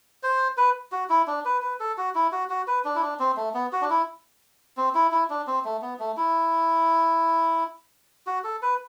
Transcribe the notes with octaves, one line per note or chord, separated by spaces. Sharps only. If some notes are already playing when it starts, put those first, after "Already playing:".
C5
B4
F#4
E4
D4
B4
B4
A4
F#4
E4
F#4
F#4
B4
D4
E4
D4
C4
A3
B3
F#4
D4
E4
C4
E4
E4
D4
C4
A3
B3
A3
E4
F#4
A4
B4